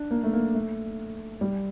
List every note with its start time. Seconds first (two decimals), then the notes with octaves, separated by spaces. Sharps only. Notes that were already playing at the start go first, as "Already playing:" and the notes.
Already playing: D4
0.11 A#3
0.23 A3
0.33 A#3
0.55 A3
1.41 G3